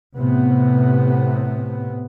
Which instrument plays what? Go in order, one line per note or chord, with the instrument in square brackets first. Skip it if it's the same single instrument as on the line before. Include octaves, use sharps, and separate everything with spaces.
[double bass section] A2 C3 B3